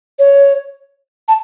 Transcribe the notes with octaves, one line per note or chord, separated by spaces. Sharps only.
C#5
A5